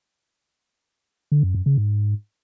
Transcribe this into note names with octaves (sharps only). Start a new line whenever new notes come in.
D3
F#2
F#2
C#3
G#2